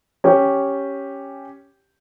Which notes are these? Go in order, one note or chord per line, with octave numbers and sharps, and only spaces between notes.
C#4 G4